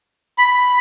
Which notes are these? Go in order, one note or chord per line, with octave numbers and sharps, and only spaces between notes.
B5